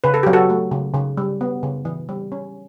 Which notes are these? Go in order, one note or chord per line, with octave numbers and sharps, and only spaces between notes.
C#3 B4
A4
F#3 G4
F#4 A4
A3
C#3
C#3
G3
B3
C#3
E3
G3
C#4